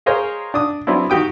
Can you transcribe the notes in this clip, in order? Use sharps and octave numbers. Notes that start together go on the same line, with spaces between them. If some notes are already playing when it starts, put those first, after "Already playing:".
G#4 A#4 C5 C#5 D#5 F5
D4 D6 D#6
F#3 B3 C4 D4 E4
D#3 F#4 G4 G5 D#6